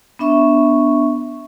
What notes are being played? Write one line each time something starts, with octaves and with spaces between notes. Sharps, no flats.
B3 D4 E5 C#6